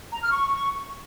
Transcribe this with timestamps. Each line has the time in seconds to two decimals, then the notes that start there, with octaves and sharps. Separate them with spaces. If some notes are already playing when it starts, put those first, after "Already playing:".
0.12 A#5
0.22 F6
0.31 C#6